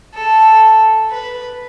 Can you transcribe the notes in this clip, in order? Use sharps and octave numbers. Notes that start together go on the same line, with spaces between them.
A4
B4